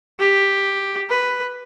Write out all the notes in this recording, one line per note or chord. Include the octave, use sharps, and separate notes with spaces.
G4
B4